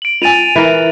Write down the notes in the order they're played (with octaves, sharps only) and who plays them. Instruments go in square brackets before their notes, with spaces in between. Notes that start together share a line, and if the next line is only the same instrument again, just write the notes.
[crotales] D7 F#7
[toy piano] F4 G#5 [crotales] A6 D#7 F7
[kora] E3 A#4